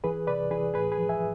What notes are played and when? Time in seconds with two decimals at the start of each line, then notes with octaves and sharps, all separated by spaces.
0.04 E3 G#4 B4
0.27 C3 B4 D5
0.51 E3 G#4 B4
0.74 A2 G#4 B4
0.92 G#4 B4
0.97 F3
1.09 E5 G#5